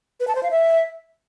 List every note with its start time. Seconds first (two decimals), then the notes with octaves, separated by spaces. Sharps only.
0.20 B4
0.28 A5
0.35 C5
0.43 F5
0.51 E5